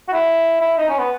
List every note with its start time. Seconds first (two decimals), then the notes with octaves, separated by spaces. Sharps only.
0.08 F#4
0.13 E4
0.61 E4
0.78 D#4
0.89 C#4
0.99 B3